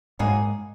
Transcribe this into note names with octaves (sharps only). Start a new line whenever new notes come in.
G#2 F#3 A#3 D#4 G#4